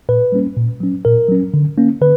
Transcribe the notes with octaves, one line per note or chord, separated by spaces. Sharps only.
A#2 B4
G3 A#3 C#4
A#2
F#3 C#4
A#2 A#4
F#3 C#4
D3
A#3 C#4
D3 B4